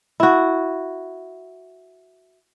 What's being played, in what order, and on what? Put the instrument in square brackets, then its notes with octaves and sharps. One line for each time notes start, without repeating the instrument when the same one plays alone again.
[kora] E4 F#4